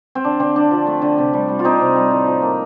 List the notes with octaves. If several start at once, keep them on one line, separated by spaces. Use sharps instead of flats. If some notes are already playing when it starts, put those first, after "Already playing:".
C4
D3 D4
D3 C4
D3 D4
F3
A3
D3
C3
G3
G3
F4
C3 C4 D#4
C3
G3
A2
F3
A#3